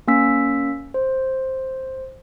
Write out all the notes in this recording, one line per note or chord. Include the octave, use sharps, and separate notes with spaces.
A#3 C#4 G#5 E6 B6
C5